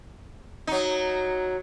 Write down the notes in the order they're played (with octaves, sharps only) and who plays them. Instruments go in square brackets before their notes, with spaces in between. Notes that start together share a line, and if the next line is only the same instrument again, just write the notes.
[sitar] F#3 D#4